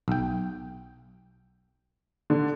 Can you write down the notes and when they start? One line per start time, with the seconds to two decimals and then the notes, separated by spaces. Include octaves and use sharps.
0.08 B1 G5
2.30 D3